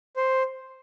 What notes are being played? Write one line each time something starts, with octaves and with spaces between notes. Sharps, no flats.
C5